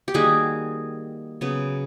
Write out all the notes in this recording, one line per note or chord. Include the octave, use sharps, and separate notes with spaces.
G4
D#3 G3 A#3 F#4 G#4
C#3 F#3 B3